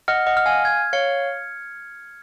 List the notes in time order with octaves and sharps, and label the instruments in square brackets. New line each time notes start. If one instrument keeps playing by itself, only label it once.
[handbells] D#5 F#5 [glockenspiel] F6
[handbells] D#5 F#5
[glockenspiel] F6
[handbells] F5 G#5
[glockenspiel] G#6
[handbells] C#5 F5 [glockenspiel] C#7